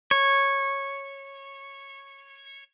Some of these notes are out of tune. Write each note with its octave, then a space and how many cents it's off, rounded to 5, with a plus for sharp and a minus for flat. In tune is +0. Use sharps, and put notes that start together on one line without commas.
C#5 -10